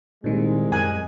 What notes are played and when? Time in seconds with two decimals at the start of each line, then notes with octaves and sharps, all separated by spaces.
0.24 C2 A#2 D#3 G#3
0.72 F#2 A#4 G#5 F#6